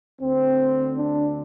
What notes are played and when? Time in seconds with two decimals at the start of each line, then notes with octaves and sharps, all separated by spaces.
0.21 D2 D3 C4
0.97 D4